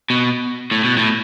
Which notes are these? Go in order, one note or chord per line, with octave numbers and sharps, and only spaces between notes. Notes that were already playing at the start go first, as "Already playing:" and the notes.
B2
A2
B2
A2